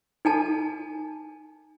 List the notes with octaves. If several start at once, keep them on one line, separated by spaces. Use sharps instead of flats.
D#4 G#5 A5